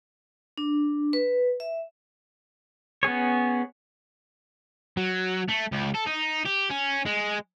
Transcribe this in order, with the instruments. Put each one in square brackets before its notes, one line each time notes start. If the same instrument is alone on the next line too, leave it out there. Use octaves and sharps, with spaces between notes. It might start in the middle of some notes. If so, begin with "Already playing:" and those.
[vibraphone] D4
B4
E5
[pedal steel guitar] B3 C#4 G#4 C#5
[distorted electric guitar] F#3
A3
C#2
A4
D#4
G4
C#4
G#3